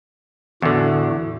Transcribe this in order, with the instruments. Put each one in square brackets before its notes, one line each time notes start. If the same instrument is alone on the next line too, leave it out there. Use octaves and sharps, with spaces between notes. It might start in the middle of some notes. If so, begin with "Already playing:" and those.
[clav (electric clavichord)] E2 D3 [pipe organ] A2 F#4